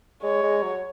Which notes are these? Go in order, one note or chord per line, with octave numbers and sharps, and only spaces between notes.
G#3 C#5
G#3
F#3